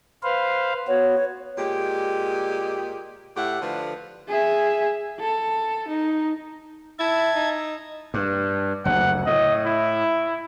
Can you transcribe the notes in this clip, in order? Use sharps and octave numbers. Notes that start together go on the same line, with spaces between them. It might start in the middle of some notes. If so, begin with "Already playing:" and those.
B4 C5 F5
B3 F#4 C#5
A#2 G#3 G4
A2 G4 E5 F#5
D3 F3 A3 B4
G#4 E5
A4
D#4
E4 E5 A5 G#6
D#4
G2
F#1 D2 F#5
A2 D#5
E4